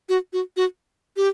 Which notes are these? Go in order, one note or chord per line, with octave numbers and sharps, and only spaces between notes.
F#4
F#4
F#4
G4